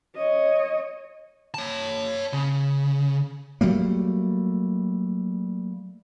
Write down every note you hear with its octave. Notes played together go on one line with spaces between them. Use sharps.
C#5 D#5
C#5 A5
C#3
F#3 G3 A3 A#3